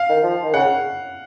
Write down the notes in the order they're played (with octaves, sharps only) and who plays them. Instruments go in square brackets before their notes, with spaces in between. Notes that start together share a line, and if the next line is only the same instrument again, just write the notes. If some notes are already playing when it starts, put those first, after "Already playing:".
Already playing: [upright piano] F5
[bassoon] D#3
F3
D#3
[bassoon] C#3 [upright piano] F#5